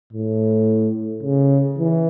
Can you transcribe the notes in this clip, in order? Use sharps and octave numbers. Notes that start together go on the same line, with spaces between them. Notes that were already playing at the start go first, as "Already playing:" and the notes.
A2
C#3
E3